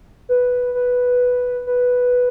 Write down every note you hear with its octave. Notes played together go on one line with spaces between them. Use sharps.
B4
B4
B4